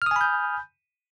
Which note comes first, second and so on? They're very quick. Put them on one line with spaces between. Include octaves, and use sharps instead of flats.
F6 D#6 G#5 B5 G6